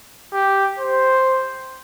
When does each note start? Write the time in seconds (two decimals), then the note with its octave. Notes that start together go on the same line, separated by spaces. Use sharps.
0.34 G4
0.79 C5